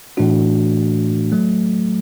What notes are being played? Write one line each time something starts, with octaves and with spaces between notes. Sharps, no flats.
A2 E3 A3 D4 F#4
F#3 A3